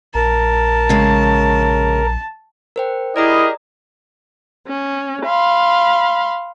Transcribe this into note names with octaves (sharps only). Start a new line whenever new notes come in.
A#1 A#4 A5
C#3 G#3 C#5
A#4 C5 G5
E4 G4 G#4 A#4 D5 D#5 A#5 D#6
C#4
F5 B5 C6